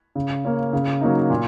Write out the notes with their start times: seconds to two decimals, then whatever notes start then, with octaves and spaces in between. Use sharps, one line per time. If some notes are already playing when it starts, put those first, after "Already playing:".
0.15 C#3
0.45 A#3 C#4
0.73 C#3
1.01 F#3 A#3 D#4
1.30 A#2